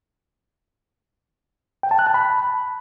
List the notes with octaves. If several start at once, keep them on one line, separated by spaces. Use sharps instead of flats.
G5
A5
F#6
A5
B5